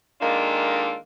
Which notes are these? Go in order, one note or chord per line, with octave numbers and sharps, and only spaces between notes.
D#3 G#3 A#3 D4 F4 A4